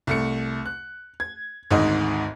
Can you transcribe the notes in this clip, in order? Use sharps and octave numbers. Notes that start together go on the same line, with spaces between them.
C2 A3 C#7
F#6
G#6
G#1 D2 G#2 D#4 D#5